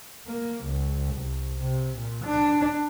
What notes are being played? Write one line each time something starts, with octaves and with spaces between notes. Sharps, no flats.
A#3
C#2
C2
C3
A#2
D4